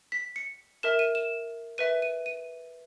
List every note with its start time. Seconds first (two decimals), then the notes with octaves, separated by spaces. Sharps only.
0.12 B6
0.36 C#7
0.83 A#4 E5 E7
0.99 D#7
1.15 E7
1.78 B4 E5 D#7
2.02 D#7
2.26 D#7